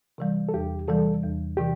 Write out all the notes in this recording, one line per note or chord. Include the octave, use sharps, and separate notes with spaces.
C3 E3 G3
A4
E2 G4
C3 E3 G3 A4
E2
C3 E3 G4